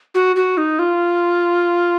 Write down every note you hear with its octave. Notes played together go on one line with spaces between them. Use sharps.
F#4
F#4
D#4
F4